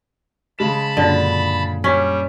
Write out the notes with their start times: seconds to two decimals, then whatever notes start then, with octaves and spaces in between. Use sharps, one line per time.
0.59 C#3 G#3 A5 B5 E7
0.97 F#2 A#2 D3
1.84 G3 C#4 B6